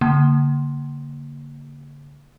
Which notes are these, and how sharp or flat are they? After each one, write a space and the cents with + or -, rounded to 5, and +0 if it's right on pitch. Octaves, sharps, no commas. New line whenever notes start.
D3 -40 A#3 -10